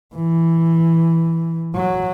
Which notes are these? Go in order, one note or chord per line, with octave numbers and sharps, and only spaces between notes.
E3
F#3